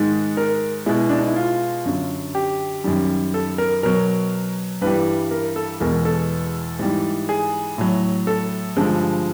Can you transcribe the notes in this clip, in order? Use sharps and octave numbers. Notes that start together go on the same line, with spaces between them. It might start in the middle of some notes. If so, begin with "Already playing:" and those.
Already playing: G#2 D#3 G#3
A#4
B2 G#3 E4
D4
D#4
E4
F4
F#2 D3 F#3
G4
F#2 D#3 G3
A4
A#4
B2 F#3 A#4
G2 E3 G3 B4
A#4
A4
E2 B2 G#3 A#4
A4
G#2 E3 G3
G#4
A2 F#3
A4
G2 D3 F3 G#3